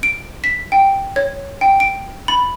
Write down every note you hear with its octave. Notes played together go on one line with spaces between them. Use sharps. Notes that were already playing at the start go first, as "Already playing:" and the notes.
D7
B6
G5
C#5
G5
D7
B5